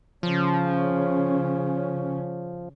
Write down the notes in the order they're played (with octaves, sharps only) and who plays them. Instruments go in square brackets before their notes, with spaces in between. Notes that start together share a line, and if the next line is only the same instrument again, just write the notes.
[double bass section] C#3 C#4 [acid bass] F3